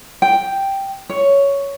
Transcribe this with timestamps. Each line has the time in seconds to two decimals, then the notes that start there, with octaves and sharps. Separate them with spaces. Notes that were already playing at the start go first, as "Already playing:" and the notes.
0.22 G5
1.10 C#5